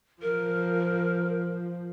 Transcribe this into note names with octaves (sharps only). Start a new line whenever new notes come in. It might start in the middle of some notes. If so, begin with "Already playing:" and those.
F3 A#4